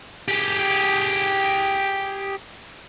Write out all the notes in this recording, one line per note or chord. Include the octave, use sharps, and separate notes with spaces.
G4 G#4